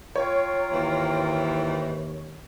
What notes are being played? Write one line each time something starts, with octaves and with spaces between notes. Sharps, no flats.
F4 C#5 G5 A#5
D#2 G#2 E3